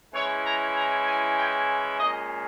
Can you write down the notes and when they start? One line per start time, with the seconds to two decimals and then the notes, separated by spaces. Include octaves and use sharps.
0.13 E3 G#3 C#4 E4 C#5
0.46 A#5
0.76 A#5
1.07 G#5
1.38 G5
2.00 A#2 G#3 C#4 D#5